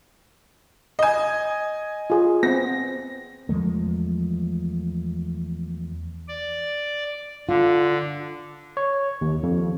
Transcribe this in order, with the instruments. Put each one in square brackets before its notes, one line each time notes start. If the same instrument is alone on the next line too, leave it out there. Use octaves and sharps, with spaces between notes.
[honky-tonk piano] D#5 G#5
[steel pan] F4 G#4
[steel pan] B3 C4 [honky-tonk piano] A#6
[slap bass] E2 F3 G#3 A3
[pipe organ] D5
[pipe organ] D3 [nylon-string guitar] F4
[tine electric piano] C#5
D#2
F2